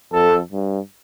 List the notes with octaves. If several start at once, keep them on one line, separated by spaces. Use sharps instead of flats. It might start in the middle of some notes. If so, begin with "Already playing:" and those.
F2 A4
G2